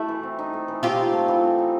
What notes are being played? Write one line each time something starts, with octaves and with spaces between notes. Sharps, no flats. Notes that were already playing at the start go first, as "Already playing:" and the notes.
Already playing: A3 E4 F#4
E3
C4
D#4
A3
E3
C4 F4 G4
D#4
A3
E3
C4
D#4